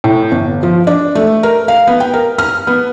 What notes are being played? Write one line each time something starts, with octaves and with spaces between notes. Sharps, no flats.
A2
G1
F3
D4
A3
A#4
F5
B3
G5
A#4
F6
B3